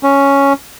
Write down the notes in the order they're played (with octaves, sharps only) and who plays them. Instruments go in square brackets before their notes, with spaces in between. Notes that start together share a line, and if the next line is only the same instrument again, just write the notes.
[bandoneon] C#4